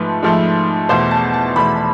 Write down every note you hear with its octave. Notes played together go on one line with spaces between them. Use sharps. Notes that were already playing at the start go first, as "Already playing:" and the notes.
Already playing: G#2 F3 A3 B4
G#2 F3 A3
E2 B2 A3 C5
A5
A5
E2 B2 A3 B5